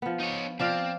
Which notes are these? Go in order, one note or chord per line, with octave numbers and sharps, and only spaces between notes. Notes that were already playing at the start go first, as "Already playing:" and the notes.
F3 B3
D#4 C#5
F3 C4 D5 F5